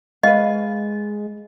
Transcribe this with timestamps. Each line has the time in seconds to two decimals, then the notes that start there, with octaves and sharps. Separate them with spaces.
0.23 G#3 B4 D#5 F5